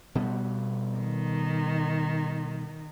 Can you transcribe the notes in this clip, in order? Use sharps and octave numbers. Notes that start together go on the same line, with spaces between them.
B2 G3 B3
D#3